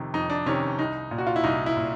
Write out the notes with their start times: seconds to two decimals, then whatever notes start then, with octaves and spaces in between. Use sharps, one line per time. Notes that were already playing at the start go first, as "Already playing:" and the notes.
Already playing: F2 C3 D#3
0.14 F2 D#4
0.30 D4
0.46 C3 D#3 C#4
0.79 C2 D#4
1.11 A#2
1.18 F#4
1.27 F4
1.36 E4
1.44 C2 D#4
1.66 E4
1.77 A#2